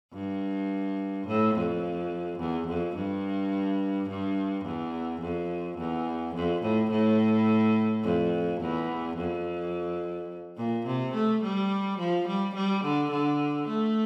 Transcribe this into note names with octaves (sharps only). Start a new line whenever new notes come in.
G2
A2
F2
E2
F2
G2
G2
E2
F2
E2
F2
A2
A2
F2
E2
F2
A#2
C3
A3
G3
F3
G3
G3
D3
D3
A3